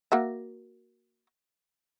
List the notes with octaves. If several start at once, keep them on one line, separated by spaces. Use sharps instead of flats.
A#3 F#4 E5